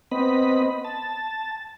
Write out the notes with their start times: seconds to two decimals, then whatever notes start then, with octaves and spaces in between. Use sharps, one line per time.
0.11 B3 C4 D#5 B5
0.84 A5